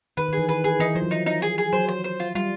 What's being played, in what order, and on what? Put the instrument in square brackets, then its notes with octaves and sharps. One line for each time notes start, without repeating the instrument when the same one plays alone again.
[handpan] D#3 [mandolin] B4
[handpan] D#3
[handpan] E3 [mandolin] G#4
[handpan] D#3 [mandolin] B4
[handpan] D#3 [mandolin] G#4
[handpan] E3 [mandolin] D#4
[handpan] F3 [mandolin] C5
[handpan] F#3
[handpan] F3 [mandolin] D#4
[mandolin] D#4
G#4
G#4
[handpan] F#3 [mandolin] C5
[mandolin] C5
C5
F4
[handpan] G3 [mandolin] F4